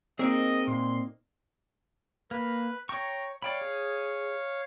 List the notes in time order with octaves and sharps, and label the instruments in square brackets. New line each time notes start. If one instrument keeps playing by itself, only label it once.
[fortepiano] A#3 D#4 [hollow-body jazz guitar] C4 [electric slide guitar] G#4 A#4 [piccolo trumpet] D#5
[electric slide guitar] A#2 [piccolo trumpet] C6
[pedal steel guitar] A#3 [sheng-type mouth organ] B4
[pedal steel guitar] C#5 C#6 [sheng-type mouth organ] G5 A#5
[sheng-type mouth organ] C#5 F5 [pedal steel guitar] D5 G5 B5
[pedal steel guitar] G#4